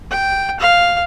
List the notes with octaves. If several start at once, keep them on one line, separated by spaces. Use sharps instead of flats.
G5
F5